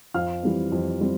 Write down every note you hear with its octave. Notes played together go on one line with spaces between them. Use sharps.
F2 F5 F6
E3 G3 C4
F2
E3 G3 C4